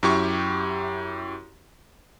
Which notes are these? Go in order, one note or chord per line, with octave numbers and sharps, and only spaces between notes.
F#2 E4 G4 C#6